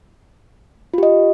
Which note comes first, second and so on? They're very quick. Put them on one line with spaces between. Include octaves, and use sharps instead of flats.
F4 G4 D#5